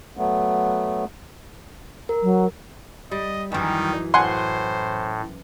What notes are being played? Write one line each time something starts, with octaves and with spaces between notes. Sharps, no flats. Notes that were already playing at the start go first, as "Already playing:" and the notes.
F#3 A3 B3
A#4
F#3
G3 D#5
F#2 D#3 E3 G3 D#4
A2 C5 F#5 G#5 C6